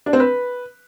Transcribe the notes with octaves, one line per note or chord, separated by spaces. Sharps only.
D4
C4
B4